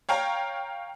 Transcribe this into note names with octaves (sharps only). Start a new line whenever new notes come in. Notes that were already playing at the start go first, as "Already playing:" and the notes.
C#5 F5 G5 A#5